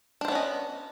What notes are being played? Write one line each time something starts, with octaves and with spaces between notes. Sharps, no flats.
B3 C#4 D4 C5 D#5